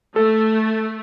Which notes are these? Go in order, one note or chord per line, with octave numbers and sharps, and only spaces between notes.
A3 A4